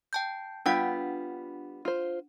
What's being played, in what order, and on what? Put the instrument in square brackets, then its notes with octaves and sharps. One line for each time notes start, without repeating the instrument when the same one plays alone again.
[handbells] G5 A5 G6
[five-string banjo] G3 F4 [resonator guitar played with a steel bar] B3 G5 [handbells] D4 F#5 B6
[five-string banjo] F4 C5